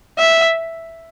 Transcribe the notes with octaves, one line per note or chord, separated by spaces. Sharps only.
E5